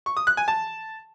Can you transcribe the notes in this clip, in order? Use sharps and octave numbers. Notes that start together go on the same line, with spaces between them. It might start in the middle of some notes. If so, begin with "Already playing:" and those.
C#6
D#6
F#6
G#5
A5